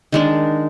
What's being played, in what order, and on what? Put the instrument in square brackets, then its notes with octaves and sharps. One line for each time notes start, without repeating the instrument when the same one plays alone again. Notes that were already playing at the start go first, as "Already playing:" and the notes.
[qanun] D#3 G#3 D4